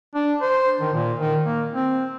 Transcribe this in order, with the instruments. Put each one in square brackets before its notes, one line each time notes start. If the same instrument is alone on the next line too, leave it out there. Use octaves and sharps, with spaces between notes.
[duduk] D4
C5
D#3
A#2
D#3
A#3
C4